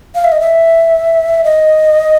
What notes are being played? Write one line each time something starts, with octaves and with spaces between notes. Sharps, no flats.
F5
E5
D#5
E5
D#5